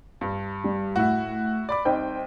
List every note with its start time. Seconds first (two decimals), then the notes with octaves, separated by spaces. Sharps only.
0.21 G2
0.64 G3
0.96 A2 E4 F#4
1.69 D5 B5 D6
1.85 C2 D#4 C5 G5